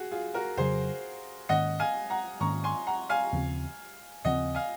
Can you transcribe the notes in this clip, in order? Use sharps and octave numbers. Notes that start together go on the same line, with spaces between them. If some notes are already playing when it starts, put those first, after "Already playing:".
Already playing: F#4 G#4
F4 G#4
F#4 A#4
F2 C#3 F#3 G#4 C5
G#2 D#3 A#3 C#4 D#5 F#5
F5 G#5
F#5 A#5
G#2 D#3 A#3 C#4 A#5 C#6
G#5 C6
F#5 A#5
F5 G#5
D#2 C#3 F3 C4
D#2 C#3 F3 C4 D#5 F#5
F5 G#5